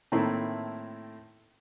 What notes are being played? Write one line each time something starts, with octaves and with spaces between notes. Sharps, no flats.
A2 D#3 A3 A#3 C4 E4